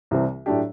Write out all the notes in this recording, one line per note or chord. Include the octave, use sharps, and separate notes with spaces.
C2 C3 E3 G3 C4
A2 F#3 A3 D4 G4